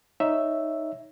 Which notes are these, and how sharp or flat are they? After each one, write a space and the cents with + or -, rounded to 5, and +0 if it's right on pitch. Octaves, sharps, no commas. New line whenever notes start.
D#4 +0 C#5 +0 E5 +0